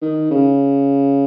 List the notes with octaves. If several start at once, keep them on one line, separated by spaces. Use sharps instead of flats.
D#3
C#3